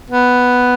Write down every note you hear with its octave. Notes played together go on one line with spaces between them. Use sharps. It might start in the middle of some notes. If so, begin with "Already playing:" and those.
B3